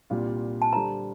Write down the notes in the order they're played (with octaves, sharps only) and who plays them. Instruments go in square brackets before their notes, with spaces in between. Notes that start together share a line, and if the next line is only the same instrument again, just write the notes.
[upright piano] C2 A#2 G3 D4 F4
[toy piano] A5
[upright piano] D3 G3 D4 A4 C5 [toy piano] A#5